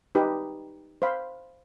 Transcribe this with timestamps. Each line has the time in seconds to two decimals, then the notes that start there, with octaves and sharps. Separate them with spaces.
0.15 D#4 G4 B4
1.02 C5 F5 B5